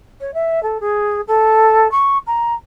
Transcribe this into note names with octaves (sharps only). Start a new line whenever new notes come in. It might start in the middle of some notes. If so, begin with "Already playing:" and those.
C#5
E5
A4
G#4
A4
C#6
A#5